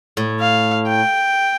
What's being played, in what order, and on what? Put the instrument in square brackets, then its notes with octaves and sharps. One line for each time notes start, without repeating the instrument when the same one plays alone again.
[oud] A2
[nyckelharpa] F5
G5